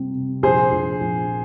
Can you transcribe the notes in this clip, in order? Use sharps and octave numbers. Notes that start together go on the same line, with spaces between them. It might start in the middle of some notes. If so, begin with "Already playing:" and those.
Already playing: C3 G3 C4
C3
A#1 G#4 C5
A#1
A#1